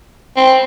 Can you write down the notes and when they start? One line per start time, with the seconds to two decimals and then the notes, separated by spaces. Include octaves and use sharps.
0.37 C4